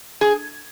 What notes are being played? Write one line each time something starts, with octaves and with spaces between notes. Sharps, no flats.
G#4